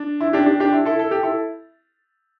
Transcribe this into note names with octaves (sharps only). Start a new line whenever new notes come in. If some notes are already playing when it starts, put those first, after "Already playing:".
Already playing: D4
E4
D4 G4
D4 G4
D4 G4
E4
E4 A4
A4
G4
E4 A4